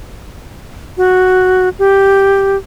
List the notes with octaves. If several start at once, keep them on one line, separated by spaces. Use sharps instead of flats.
F#4
G4